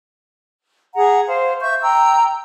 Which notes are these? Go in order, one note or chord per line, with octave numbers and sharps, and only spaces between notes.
G#4 F#5 A#5
C5 F5
E5 C#6 G6
G5 A#5 E6